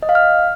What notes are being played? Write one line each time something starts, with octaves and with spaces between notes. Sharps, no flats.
D#5
F5
F6